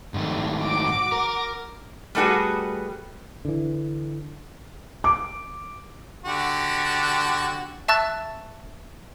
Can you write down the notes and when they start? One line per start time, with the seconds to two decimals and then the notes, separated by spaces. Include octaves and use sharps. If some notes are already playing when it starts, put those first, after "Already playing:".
0.14 G#2 D#3 A3
0.58 F#4 D6
1.12 A#4
2.15 G3 A3 B3 F#4 G#4
3.45 D3 E3
5.04 D6
6.25 D3 F#4 G4
7.88 E5 A5 C#6 E6 F#6 A6